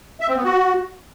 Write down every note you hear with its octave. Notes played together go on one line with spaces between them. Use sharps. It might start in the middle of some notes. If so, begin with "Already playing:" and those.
E5
C4
B3
F#4